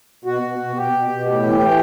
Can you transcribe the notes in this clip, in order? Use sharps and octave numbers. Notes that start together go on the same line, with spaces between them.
B2 F#4
B2
B2
B2 G4
B2
B2
A2 G4
E3
E3